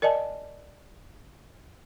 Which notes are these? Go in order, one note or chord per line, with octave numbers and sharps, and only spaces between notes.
A#4 D5 D#5 G#5 A5